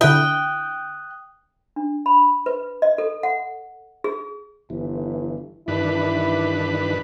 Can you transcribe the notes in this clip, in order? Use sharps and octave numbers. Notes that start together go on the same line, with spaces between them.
D3 E4 G5 D#6 F#6
D4
B5
B4
D#5
A4
F#5
G#4
G1 E3
G2 D#3 E3 D4 E4 B4